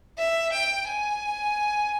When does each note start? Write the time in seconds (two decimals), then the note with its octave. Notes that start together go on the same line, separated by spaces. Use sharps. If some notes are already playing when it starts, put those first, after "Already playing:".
0.18 E5
0.53 G5
0.87 G#5